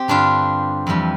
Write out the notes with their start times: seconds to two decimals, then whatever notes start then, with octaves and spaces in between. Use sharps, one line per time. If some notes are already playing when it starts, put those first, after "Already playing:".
Already playing: C4 G4
0.08 G2 D3 G3 D4 F4
0.87 F2 E3 G3